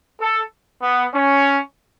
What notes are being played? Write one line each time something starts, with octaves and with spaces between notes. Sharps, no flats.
A4
B3
C#4